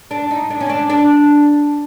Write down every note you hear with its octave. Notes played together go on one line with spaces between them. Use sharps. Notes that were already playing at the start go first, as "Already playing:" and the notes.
D4
D#4
D4
C#4
D4
D4